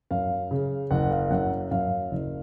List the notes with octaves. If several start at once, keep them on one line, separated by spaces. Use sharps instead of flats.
F#2 F5
C#3
F#1 F#5
F5
F#2 F#5
F#2 F5
F#1